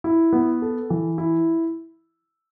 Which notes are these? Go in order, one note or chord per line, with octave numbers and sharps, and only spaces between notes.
E4
B3
A4
E3
E4